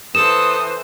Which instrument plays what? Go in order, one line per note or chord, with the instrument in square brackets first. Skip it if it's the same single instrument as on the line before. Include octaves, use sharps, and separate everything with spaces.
[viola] E3 C5 [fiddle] A4 [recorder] D#6 [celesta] E7